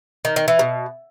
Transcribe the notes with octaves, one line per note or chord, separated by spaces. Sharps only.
D#3
D#3
E3
B2